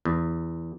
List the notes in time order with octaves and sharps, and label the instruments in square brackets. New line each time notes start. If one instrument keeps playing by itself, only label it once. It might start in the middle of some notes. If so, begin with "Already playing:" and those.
[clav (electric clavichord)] E2